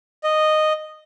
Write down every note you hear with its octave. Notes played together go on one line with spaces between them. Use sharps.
D#5